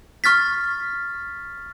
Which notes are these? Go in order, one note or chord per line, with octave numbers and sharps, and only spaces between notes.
C#6 F6 A6 B6